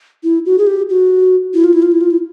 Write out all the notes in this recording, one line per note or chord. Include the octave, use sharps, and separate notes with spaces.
E4
F#4
G#4
G4
F#4
E4
F4
E4
F4
E4
F4
E4